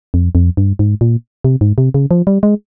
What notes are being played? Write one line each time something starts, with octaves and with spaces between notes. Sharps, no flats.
F2
F2
G2
G#2
A#2
C3
G#2
C3
C#3
F3
G3
G#3